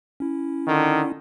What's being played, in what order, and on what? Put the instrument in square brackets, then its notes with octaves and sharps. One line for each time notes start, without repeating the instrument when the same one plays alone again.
[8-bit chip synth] C#4 E4
[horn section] D3 D#3